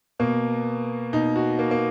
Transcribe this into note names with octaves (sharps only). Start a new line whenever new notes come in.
B2 A#3
B2 D#4
F#4
A#3
A#3